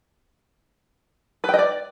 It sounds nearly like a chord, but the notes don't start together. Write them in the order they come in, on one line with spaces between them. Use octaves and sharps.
B4 G5 D#5 D5